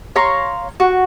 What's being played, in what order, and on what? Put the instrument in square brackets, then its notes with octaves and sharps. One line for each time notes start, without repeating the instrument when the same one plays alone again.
[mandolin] C#5 F5 A#5 C6
F#4